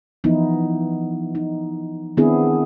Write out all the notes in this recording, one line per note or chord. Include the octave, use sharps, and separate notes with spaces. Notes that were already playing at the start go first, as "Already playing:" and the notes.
E3 F3 B3 D#4 E4
D#4
D#3 B3 C4 D4 E4 G#4